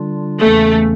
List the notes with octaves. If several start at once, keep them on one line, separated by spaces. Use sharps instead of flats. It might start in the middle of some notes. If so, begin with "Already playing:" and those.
Already playing: D3 G3 D4 F4
E2 C#3 E3 A3 A#3 C#4